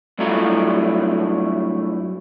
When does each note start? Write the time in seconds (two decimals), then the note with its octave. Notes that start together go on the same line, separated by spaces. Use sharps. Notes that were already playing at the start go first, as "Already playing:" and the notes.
0.19 G2 F#3 A3 E4 F4 A#5